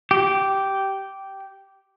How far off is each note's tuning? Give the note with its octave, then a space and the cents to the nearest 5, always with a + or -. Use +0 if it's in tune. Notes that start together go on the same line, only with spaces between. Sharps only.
G4 -10